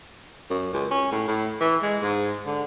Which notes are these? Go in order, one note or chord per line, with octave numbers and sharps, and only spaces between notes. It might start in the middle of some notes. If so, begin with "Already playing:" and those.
F#2
C#2
C#4
A2
A2
E3
G#3
G#2
D3